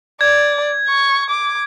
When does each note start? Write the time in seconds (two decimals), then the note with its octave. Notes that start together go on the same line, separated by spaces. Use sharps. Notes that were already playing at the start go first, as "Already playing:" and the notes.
0.21 D5 G#6
0.88 C#6
1.30 D6